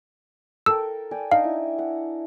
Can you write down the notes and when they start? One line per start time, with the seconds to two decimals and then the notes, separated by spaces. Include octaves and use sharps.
0.66 A4 A#4 G5 E6
1.11 D5 G5 G#5
1.32 D4 D#4 F5 C#6
1.44 E4
1.78 F#5